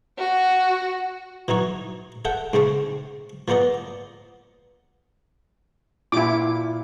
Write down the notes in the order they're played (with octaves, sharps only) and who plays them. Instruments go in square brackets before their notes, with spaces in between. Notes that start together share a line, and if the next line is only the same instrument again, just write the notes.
[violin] F#4
[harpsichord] E3 F#3 D#4 C#5
A4 E5 F#5 G5
G#2 C#3 C4 C#4
F3 A#3 B3 D5 D#5
[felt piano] A#2 F4 F5 [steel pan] E4 D6